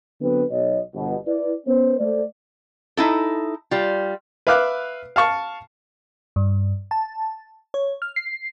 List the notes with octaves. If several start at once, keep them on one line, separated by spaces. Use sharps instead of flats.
D3 F#3 B3 C4 B4
B1 C#5 D#5
G1 B2
E4 B4 D5
B3 C#4 C5
A3 C5 D5
D#4 E4 A4
G3 F4
B4 E5 F5 D6 F#6
F5 A5 C#6
G2
A5
C#5
F6
C7